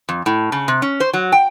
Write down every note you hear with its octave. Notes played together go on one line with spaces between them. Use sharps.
F2
A2
C#3
C3
C#4
C5
F#3
G5